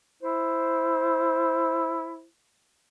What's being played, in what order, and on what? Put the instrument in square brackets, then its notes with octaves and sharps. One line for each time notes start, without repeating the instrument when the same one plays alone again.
[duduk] E4 [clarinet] C5